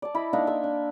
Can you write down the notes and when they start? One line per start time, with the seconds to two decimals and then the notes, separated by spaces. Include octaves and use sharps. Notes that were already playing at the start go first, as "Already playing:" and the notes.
0.02 D5 A5
0.15 E4 D#5 B5
0.33 A#3 D4 D#4 E5
0.47 E5 C6
0.64 D4